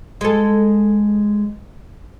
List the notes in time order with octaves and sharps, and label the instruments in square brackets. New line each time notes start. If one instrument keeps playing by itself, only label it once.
[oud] G#3 A4